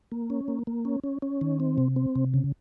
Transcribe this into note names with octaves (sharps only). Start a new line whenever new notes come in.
A#3
C#4
A#3
A#3
C#4
C#4
C#4
D#3
C4
C3
C4
C3
C#3